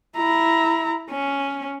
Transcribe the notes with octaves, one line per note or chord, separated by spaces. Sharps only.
E4 A#5
C#4